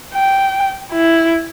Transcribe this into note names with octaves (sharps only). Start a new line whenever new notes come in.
G5
E4